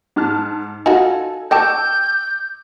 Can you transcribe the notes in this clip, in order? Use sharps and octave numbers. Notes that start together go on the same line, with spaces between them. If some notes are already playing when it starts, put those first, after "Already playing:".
G#2 A5 F6
D#4 F4 F#4 A4 G#5
D#5 G5 A5 C#6 D6 E6 G6